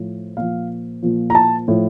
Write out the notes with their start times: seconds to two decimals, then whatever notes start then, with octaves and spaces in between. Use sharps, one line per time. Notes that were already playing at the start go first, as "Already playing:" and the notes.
Already playing: A2 F3
0.37 A#2 F3 F5
1.02 A#2 F3
1.30 A#5
1.35 A5
1.68 A2 F3